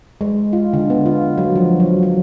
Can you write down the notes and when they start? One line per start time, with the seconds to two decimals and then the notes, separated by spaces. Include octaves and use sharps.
0.21 G#3
0.53 F4
0.73 D3
0.90 B3
1.06 F4
1.38 F#3
1.56 F3
1.80 F#3
2.03 F#3